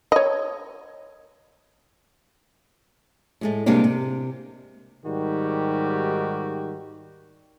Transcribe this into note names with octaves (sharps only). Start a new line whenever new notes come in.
C#5 D#5
A2 G#3 A3
C3 G3 G#3 A#3 C4 D4
C3
G#2 D#3 G3 F#4 G4